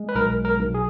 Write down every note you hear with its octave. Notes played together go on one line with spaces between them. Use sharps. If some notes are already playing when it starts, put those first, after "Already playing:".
Already playing: G#3
B4
B1 A#4
A#4
B1
G#4